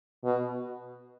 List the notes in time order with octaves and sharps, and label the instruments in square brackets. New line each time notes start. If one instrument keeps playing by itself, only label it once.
[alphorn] B2